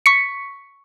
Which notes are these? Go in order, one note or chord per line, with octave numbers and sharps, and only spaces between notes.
C#6 B6 C#7